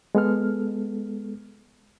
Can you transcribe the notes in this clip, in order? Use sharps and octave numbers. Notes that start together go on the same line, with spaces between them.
G#3 B3 A4 F6